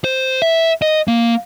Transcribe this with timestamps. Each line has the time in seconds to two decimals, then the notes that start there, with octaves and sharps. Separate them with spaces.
0.04 C5
0.42 E5
0.82 D#5
1.08 A#3